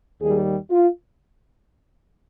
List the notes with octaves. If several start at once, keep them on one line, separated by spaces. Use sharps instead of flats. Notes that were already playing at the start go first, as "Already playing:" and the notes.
D#2 D#3 G3 G#4
F4